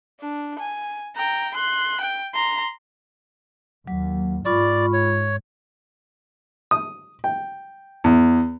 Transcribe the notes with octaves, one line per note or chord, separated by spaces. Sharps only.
D4
G#5
G5 A#5
C6 F#6
G5
A#5 C6
D#2 F#3
G#2 F4 D5 B5 C#6
C#5
D#6
G5
E2